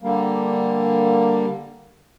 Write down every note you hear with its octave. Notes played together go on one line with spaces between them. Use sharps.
D3 G3 A#3